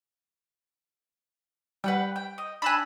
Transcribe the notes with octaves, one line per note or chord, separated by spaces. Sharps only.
G3 B4 F#5 G5
G5
D#5
D4 G#5 B5 E6 F#6